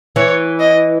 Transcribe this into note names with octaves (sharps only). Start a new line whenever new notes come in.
E3 C#5
D#5